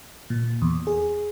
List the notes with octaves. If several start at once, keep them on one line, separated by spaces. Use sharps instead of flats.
A#2
E2
G#4